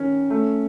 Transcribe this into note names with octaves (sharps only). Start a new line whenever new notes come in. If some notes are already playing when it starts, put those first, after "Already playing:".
Already playing: D#3 C#4
A3